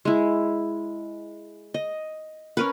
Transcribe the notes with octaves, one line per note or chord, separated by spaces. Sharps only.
G#3 E4
D#5
C#4 A#4 B4